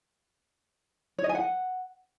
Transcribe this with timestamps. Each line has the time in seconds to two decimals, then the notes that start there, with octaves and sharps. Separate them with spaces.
1.18 C#5
1.24 D#5
1.29 G#5
1.35 F#5